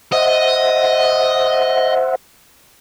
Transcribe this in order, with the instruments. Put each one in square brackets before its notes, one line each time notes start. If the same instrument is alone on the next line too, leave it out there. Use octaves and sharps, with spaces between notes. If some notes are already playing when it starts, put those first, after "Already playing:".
[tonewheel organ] C5 E5 F#5 [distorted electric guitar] D#5